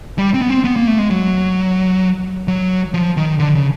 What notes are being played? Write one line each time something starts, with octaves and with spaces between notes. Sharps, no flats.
G3
C4
B3
C4
B3
A#3
A3
G#3
F#3
F#3
F3
D#3
D3
C#3